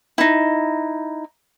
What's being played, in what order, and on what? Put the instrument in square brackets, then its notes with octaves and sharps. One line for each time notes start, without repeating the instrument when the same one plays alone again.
[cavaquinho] D#4 E4